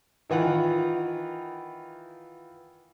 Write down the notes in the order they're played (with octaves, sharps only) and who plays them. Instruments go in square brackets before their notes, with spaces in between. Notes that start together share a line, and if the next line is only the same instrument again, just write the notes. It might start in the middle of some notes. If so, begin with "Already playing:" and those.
[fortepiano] D#3 E3 F4 F#5